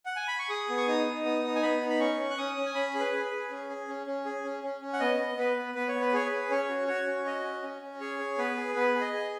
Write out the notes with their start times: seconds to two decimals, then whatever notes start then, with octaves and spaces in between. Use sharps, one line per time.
0.06 F#5
0.16 G#5
0.28 B5
0.39 C#6
0.49 G#4 D#6
0.69 B3
0.77 C#6
0.87 D#4 D#6
1.06 D#4
1.25 B3 D#6
1.44 D#4
1.55 G#5
1.63 B3 B5
1.81 D#4
1.90 B5
1.99 C#4 C#6
2.19 C#4
2.30 F#6
2.38 C#4 D#6
2.56 C#4
2.66 G#5
2.74 C#4 B5
2.94 G#4
3.00 B4
3.13 G#4
3.25 B4
3.32 G#4
3.51 C#4
3.69 G#4
3.88 C#4
4.07 C#4
4.25 G#4
4.44 C#4
4.63 C#4
4.81 C#4
4.93 F#5
5.00 B3 D#5
5.19 B3
5.37 B3 B4
5.57 B3
5.75 B3 B4
5.88 C#5
5.94 B3
6.01 B4
6.13 G#4 C#5
6.27 G#4 B4
6.50 C#4 C#5
6.69 F#4
6.87 F#4 C#5
7.07 C#4
7.25 F#4 D#5
7.44 C#4
7.62 C#4
7.82 C#4
8.00 G#4 C#5
8.19 G#4
8.38 B3 B4
8.57 G#4
8.75 B3 B4
8.95 G#4
9.01 D#5
9.13 G#4